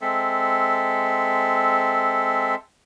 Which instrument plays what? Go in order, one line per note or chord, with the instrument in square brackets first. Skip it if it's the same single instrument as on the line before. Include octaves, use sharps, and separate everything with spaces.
[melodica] G#3 C4 A4 E5